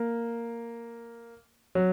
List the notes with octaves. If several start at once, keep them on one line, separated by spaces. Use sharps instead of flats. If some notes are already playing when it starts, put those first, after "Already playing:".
Already playing: A#3
F#3